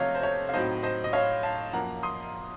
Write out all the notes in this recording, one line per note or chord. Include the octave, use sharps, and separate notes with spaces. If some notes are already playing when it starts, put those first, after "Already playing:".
Already playing: C3 F3 A3 C#5 D#5 F5
C5
C#5
F5
A2 F#3 C4 D#4 C5 D#5
C5 D#5
D#5
C#5 F5
F5 A5
F#2 F3 A#3 F4 F#5 A#5
C6 D#6